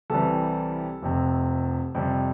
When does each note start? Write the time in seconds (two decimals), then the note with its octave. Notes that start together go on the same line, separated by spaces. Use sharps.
0.10 C2 C3 E3 G3 A4
1.02 F1 F2 C3
1.95 F2 C3 G3